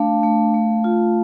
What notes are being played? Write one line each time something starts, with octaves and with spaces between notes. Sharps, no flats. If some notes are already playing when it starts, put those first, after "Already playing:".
Already playing: A3 D4 F5 A5
A3
A3
F4